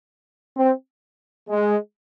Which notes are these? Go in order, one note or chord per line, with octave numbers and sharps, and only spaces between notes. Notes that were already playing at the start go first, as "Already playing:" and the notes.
C4
G#3